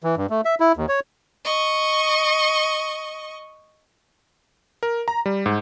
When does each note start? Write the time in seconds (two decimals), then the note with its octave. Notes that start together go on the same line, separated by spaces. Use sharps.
0.04 E3
0.17 G2
0.30 A3
0.45 E5
0.60 E4
0.77 D#2
0.89 C#5
1.44 D#5 C#6
4.83 A#4
5.08 A#5
5.26 G3
5.46 G#2